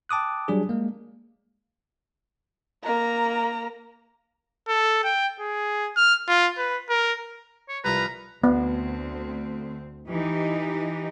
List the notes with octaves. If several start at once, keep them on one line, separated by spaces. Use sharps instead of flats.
G5 A5 D6 D#6 F#6
F#3 G3 D4 G#4
G#3 A#3
A#3 A#5
A4
G5
G#4
F6
F4
B4
A#4
C#5
C2 F3 A#4 B4 A#5
D2 B3 C4
E3 D#4 G4